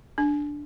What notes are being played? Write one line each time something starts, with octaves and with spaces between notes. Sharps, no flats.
D4